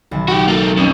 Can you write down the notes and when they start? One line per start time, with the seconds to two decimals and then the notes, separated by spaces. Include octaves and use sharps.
0.11 B1 D#3 A5
0.28 F#4 G4
0.48 A#3 A4
0.77 F2 C#3